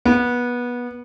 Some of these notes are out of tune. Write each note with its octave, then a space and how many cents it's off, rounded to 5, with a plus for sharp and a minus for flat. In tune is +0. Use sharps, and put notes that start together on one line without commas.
B3 -20